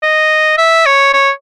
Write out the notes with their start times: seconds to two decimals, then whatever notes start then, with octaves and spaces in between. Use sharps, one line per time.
0.03 D#5
0.58 E5
0.86 C#5
1.14 C#5